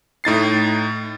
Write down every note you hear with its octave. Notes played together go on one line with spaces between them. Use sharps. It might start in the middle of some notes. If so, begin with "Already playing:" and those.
A2 D#4 A6 C7